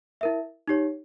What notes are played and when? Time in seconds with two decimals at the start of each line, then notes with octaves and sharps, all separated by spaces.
0.21 E4 A#4 E5
0.68 D#4 G4 C#5